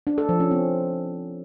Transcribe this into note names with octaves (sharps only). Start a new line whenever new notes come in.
D4
A4
F3
C#4
C4